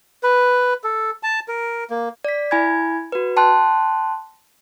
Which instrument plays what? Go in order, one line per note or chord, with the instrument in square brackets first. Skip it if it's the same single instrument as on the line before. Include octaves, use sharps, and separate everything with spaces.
[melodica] B4
A4
A5
A#4
A#3
[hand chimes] D5 B6
E4 G#5 B5 G#6
F#4 B4
G5 A5 C6 F#6